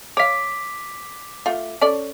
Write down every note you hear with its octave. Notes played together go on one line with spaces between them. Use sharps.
C#5 F5 D6 B6
A3 F4
C#4 A4 D5